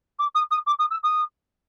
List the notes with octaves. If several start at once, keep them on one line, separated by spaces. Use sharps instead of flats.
D6
D#6
D#6
D6
D#6
E6
D#6